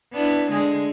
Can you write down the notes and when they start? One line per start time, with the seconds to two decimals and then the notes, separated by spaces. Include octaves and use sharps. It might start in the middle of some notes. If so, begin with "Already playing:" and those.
0.13 B3 D4 E4
0.50 D3 G#3 G#4